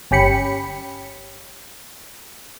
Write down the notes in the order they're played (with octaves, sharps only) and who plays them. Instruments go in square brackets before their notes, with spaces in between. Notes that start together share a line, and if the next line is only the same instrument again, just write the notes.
[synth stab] G1 C#4 G4 B5 C#7